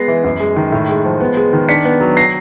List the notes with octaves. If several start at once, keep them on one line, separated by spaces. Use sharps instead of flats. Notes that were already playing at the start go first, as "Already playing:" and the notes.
Already playing: G#3 B3 A#6 C7
E3
F#2
G#3
D#3
A2
G#3
F3
B3
G#3
D#3
D4 B6 C#7
B3
F#3
A#6 C7